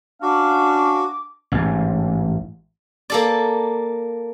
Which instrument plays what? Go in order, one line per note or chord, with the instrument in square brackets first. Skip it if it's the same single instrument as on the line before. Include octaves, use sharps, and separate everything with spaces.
[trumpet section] C#4 F5 [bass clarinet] D4 [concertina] F#4 [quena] D6
[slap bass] A1 G#2
[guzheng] A#3 A4 D5